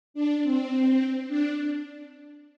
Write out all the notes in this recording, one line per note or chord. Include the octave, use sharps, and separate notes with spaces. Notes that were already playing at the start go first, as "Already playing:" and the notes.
D4
C4
D4